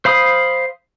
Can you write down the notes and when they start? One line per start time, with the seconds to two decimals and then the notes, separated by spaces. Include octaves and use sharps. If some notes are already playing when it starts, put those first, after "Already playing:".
0.05 C5 F5 B5 D#6